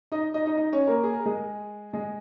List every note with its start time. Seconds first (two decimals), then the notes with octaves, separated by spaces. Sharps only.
0.12 D#4 D#5
0.34 D#4 D#5
0.46 D#4 D#5
0.57 D#4 D#5
0.73 C#4 C#5
0.87 A#3 A#4
1.03 G#4
1.13 A#4
1.26 G#3 G#4
1.93 G#3 G#4